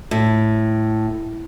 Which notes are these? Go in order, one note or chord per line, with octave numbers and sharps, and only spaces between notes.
A2